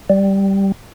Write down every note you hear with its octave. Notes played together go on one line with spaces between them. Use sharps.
G3